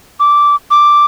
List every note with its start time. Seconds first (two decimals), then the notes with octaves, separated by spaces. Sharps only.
0.20 D6
0.71 D6